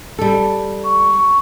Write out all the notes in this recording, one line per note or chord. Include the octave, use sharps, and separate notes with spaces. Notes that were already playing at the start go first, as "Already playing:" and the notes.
G3 A4
C#6